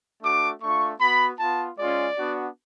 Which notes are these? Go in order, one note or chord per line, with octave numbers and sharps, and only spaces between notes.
A3 D4 F#4 D6
A3 D4 F4 C#6
B3 F#4 B5
B3 F4 A5
G#3 C#4 F4 D5
B3 D4 F#4